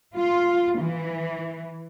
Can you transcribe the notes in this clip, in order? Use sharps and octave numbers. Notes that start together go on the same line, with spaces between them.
F4
E3